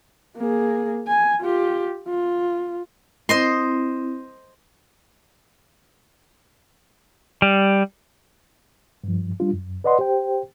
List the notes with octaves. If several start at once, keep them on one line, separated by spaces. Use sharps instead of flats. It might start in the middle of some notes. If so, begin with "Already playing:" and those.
A#3 G#4
G#5
F4 G4
F4
C4 E4 C5 D#5 C6
G3
G2 F3
G3 D4 F4
F#2
B4 D5 D#5 F#5 C6
G4 C5 G5